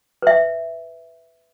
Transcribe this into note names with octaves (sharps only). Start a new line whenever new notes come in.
B4 E5